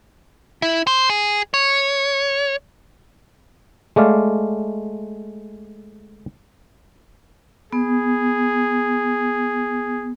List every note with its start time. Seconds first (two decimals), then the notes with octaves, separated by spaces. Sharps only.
0.62 E4
0.87 C5
1.10 G#4
1.54 C#5
3.96 G#3 A3 D5 F5
7.73 B3 G#4